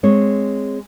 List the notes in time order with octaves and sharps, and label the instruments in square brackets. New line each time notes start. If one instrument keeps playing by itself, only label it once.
[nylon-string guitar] G#3 C4 C#5